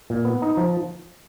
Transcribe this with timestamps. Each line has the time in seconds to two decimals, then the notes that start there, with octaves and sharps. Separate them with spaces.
0.10 A#2
0.25 B3
0.42 D#4
0.57 F3